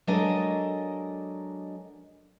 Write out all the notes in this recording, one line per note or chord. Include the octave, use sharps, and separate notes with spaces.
F#3 G#3 D4 A4 A#4 D#5